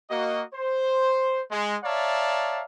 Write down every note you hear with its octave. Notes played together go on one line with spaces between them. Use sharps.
A#3 F#4 D#5
C5
G#3
C#5 D5 E5 F5 A5 A#5